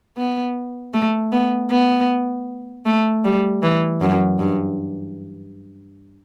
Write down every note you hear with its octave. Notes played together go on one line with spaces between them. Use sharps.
B3
A3
B3
B3
A3
G3
E3
F#2
G2